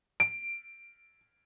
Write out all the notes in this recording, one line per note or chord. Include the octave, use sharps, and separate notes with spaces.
D7